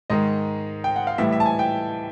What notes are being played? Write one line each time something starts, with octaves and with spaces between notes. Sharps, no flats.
G#2 D#3 G#3 D#5
G5
F#5
F5
A2 E3 G3 E5
E5
A5
G#5
G5